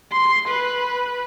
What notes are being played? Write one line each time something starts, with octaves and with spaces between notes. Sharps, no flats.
C6
B4